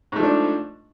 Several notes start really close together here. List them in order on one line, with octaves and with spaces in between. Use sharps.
G#2 A3 F3 D4